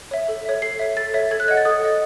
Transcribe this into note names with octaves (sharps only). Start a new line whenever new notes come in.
C#5 E5
A4
C#5 E5
A4 C7
C#5 E5
A4 A6
C#5 E5
A4 G#6
F#6
D#5 F#5 G#6
A6
A4 D#6
D#5 F#5